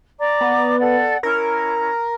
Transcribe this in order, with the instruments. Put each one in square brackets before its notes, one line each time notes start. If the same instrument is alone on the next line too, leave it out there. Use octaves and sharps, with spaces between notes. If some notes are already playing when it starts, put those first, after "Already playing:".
[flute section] D5 A#5 D6
[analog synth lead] B3
[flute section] A4 D5 F#5
[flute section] C#4 E4 [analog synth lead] A#4